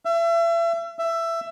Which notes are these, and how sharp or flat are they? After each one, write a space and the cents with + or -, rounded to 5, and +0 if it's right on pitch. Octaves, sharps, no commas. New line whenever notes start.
E5 +35
E5 +15